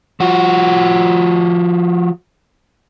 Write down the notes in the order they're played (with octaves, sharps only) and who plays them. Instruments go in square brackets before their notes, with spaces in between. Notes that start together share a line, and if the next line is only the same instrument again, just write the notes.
[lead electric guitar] F3 F#4